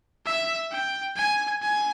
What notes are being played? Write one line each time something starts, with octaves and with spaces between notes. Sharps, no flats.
E5
G5
G#5
G#5